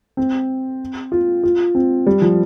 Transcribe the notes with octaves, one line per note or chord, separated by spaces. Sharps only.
C4
F4
F4
C4
G3
F3